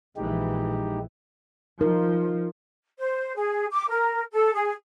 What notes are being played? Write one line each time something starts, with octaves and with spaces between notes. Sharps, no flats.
A#1 E3 G#3 D#4 G4
F3 D#4 A#4
C5
G#4
D6
A#4
A4
G#4